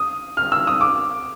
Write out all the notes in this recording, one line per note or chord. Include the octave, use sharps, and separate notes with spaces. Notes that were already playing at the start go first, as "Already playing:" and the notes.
Already playing: D#6
F6
E6
D#6
D6